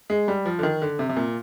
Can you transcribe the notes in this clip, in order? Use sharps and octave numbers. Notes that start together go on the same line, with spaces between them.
G#3
G3
F3
D3
D#3
D3
C3
C3
A#2